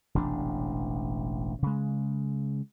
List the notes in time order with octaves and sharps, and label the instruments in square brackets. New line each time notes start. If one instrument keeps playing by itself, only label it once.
[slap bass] E1 A1 C3 D4
C#3 G#3